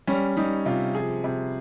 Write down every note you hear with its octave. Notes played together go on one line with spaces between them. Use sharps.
G3 C#4
G3 D#4
C3 F4
F3 G#4
C3